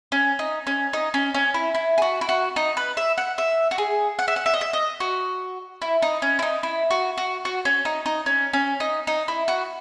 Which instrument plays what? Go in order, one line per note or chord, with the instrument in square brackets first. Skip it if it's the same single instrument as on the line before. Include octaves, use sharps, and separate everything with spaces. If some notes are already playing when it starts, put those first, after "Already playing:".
[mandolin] C#4
D#4
C#4
D#4
C#4
C#4
E4
E4
G#4
F#4
E4
F#4
D#4
B4
E5
F#5
E5
F#4
G#4
F#5
E5
F#5
E5
D#5
E5
D#5
F#4
E4
D#4
C#4
E4
D#4
E4
F#4
F#4
F#4
C#4
D#4
D#4
C#4
C#4
D#4
D#4
E4
F#4